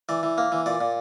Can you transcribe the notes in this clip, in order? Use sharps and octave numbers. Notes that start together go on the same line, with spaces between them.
E3 D5
E3
A#3
E3
A#2 D5
A#2